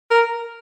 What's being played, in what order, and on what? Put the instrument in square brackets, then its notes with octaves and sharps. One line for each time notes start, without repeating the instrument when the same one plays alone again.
[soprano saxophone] A#4